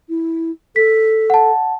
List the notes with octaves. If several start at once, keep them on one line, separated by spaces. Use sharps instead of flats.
E4
A4 B6
F#5 A5